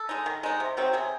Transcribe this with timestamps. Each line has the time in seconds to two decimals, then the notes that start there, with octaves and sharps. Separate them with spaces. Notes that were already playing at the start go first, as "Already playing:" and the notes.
Already playing: A4
0.09 G#3 D#4
0.26 D#3
0.43 G#3 D#4
0.60 C3
0.77 D#3 F#3 C4
0.93 C3 G#4